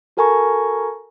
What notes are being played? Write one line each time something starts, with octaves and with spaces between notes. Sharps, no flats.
F#4 A4 A#4 G#5 A#5 C#6